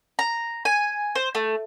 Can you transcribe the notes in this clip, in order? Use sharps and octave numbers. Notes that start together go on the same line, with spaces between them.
A#5
G#5
C5
A3